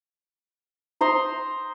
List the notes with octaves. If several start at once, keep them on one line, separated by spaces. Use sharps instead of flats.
C5 A#5 C6 D#6